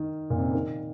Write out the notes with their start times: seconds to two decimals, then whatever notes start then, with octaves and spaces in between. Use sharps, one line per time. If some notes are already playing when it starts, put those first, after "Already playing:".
Already playing: D#3
0.30 A#2
0.38 C3
0.46 C#3
0.54 D#3